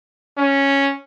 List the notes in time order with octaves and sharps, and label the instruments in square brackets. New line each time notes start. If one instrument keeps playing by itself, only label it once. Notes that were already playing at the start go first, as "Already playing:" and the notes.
[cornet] C#4